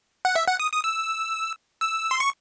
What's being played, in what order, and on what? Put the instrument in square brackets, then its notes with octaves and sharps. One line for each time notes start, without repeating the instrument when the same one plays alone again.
[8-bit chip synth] F#5
E5
F#5
D#6
D#6
E6
E6
C6
C#6